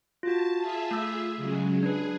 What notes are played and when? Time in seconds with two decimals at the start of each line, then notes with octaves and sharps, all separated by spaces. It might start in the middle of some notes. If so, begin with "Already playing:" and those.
0.23 F4 F#4 A5
0.60 F4 G#4 E5 A5
0.91 A3 E6
1.37 C#3 F#3 G#3
1.83 D4 G#4 B4